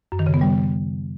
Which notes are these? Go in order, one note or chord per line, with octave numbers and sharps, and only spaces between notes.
F#2
D#3
C#3
B3
G3